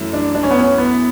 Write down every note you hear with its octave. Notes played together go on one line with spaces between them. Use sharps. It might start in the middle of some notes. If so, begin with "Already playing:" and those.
Already playing: F#2 E3 A3 E4
D4
D4
C#4
B3
C#4
B3